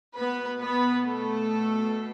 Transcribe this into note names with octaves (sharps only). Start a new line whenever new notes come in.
B2 B3 B4
B3 B4
A3 A4